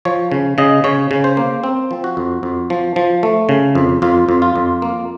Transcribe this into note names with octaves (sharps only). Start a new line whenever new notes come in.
F3 C#5
C#3
C#3 D#5
C#3 C#5
C#3
C5
A#3
C4
F3
F#4
F2
F2
F3
F3
A3
C#3
F2
F2 F4
F2
F4
F2
A#3